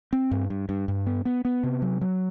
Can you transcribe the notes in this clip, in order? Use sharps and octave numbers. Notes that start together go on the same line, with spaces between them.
C4
G2
G2
G2
G2
B3
B3
B3
C3
F#3
F#3